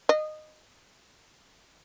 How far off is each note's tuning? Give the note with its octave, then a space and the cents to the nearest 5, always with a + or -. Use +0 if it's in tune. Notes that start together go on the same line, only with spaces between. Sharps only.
D#5 -15